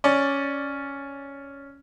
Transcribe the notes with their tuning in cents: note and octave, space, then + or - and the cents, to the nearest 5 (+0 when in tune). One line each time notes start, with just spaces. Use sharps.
C#4 +5 D5 +0